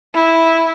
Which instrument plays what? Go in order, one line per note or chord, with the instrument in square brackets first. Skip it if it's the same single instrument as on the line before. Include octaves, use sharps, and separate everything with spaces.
[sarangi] E4